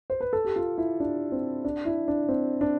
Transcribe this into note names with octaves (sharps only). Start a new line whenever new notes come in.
C5
B4
A4
G4
F4
E4
D4
C4
D4
E4
D4
C4
D4